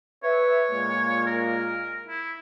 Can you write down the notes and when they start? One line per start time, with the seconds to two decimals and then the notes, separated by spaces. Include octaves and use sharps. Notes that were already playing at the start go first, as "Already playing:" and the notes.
0.24 B4 C#5 E5
0.71 A#2 G#3 A#3
1.26 A#4
2.07 E4